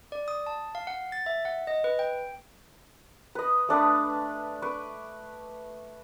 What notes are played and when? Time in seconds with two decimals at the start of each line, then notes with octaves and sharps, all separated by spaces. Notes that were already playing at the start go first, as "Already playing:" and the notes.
0.12 D5
0.28 D#6
0.46 A5
0.75 F5
0.87 F#5
1.12 A6
1.26 E5
1.45 F#5
1.67 D#5
1.84 B4
1.99 G5
3.35 B4 D#5
3.69 A3 D4 B4 D#6
4.62 B4 C#6 D6